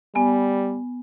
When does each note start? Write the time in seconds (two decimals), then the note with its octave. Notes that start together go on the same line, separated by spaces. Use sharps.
0.15 G3 B3 G#5